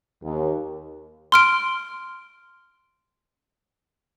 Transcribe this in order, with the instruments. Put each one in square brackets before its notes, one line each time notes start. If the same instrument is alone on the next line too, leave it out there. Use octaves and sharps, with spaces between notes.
[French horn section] D#2
[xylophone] C6 F6 D7